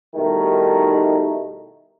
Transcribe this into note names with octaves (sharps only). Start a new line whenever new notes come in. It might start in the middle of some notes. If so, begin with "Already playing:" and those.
B2 D#3 G3 A3 D#4 E4